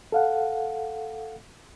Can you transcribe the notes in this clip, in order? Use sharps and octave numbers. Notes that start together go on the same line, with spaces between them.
A4 F5 F#5